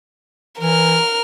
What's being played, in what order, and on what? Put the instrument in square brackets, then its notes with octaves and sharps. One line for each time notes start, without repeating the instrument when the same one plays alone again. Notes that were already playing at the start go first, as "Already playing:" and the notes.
[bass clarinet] E3 [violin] A#4 F6